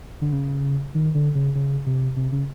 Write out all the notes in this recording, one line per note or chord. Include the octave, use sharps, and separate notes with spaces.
D3
C#3
D#3
D3
C#3
C#3
C3
C3
C#3